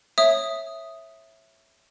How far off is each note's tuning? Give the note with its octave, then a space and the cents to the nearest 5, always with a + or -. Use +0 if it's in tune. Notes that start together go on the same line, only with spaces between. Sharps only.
C#5 -20 E5 +0 D#6 +0